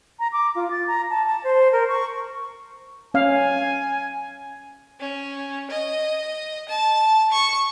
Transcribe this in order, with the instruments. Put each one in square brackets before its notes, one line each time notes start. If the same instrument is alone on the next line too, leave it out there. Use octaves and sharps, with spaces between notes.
[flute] A#5
D6
F4
A6
A#5
A5
A5
C5
A#4
C#6
[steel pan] C#4 F5 [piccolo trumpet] G#5
[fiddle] C#4
D#5
A5
C#6